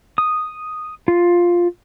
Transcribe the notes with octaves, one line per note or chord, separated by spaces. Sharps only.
D#6
F4